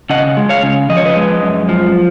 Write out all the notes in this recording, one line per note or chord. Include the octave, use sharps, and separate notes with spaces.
C#3 D#5 F#5
G#3
C#5 F5
C#3
F3 D#5
C#5
B4 D#5
G#3
F#2
F3